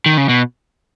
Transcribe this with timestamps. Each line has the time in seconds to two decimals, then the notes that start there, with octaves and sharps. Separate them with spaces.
0.06 D#3
0.18 C#3
0.29 B2